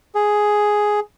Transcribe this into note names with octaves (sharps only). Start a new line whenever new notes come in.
G#4